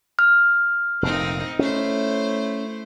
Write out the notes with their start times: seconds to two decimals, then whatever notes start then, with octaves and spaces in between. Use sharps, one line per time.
0.19 F6
1.03 F1 A#2 C4 D#4
1.59 A3 C#4 E4 C5